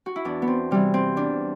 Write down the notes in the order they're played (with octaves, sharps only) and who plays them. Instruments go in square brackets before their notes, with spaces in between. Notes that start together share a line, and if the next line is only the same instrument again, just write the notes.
[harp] F#4
E4
E2 D4
B3
C4
C3 E3 G3
C4
E2 D4